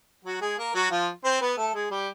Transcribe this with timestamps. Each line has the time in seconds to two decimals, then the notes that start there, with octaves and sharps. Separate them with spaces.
0.25 F#3 F#4
0.41 G#3 G#4
0.58 A#3 A#4
0.74 F#3 F#4
0.91 F3 F4
1.24 C4 C5
1.41 B3 B4
1.57 A3 A4
1.74 G#3 G#4
1.91 G3 G4